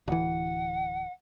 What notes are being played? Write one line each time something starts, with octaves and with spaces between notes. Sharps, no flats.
D1 E3 F#5